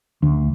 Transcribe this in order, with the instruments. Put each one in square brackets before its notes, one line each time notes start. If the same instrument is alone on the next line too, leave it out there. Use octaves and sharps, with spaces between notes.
[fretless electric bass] D2